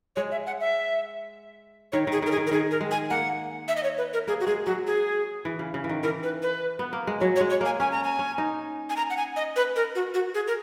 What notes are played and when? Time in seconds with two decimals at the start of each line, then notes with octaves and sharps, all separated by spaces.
0.16 G#3 C#5
0.31 E5
0.47 F#5
0.60 E5
1.92 D#3 C#5
2.07 D#3 G#4
2.22 D#3 A#4
2.31 G#4
2.37 D#3
2.47 A#4
2.51 D#3 G#4
2.71 A#4
2.81 G#3
2.91 G#5
3.10 A#3 F#5
3.68 E5
3.77 D#5
3.83 C#5
3.98 B4
4.13 A#4
4.27 A#3 G#4
4.40 F#4
4.47 G#3 G#4
4.66 F#3 F#4
4.87 G#4
5.45 E3
5.59 C#3
5.74 C#3
5.84 E3
5.89 D#3
6.03 E3 A#4
6.23 B4
6.42 B4
6.79 B3
6.93 A#3
7.07 G#3
7.20 F#3 C#5
7.36 C#5
7.41 G#3
7.50 C#5
7.61 A#3 G#5
7.80 C#4 G#5
7.91 A#5
8.03 G#5
8.19 C#4
8.38 D#4
8.90 G#5
8.97 A#5
9.10 F#5
9.17 G#5
9.36 D#5
9.56 B4
9.76 A#4
9.95 F#4
10.14 F#4
10.35 G#4
10.47 A#4